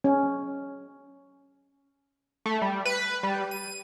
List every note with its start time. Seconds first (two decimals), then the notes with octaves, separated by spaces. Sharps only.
0.04 C#4
2.46 A3
2.62 G3
2.85 B4
3.23 G3
3.51 D#7